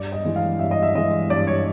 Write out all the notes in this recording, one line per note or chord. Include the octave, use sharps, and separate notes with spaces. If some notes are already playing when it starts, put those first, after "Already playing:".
Already playing: G2 D5
D#5
E3 G#3
F5
G2 E5
D#5
E5
E3 G#3 D#5
G2 D5
C#5